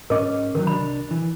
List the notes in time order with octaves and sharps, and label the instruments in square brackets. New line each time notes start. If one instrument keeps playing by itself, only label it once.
[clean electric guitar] G#2 C#4 [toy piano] A#4 D#5 D6
[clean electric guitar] D#3 F3 F#3 [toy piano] A#4
[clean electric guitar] C2 D4 [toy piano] B5
[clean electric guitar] E3